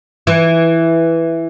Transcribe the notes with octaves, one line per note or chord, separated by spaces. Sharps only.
E3